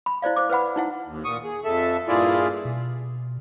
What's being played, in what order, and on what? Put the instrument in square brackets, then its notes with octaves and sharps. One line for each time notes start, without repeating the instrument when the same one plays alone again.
[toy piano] B5
E4 C5 D5 F5
C5 D6
B4 C5 F#5 B5
D#4 E4 F#5
[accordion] D#2
A#2 C#6 D#6
G#4
F2 A4 E5
G2 A#2 E4 F4 G#4 D5
[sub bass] B2